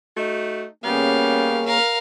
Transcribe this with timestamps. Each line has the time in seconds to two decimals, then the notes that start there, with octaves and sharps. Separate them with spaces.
0.17 A3 D#4 F#4
0.84 C#3 G3 A#3 B3 C#4 F5
1.66 A#4 F5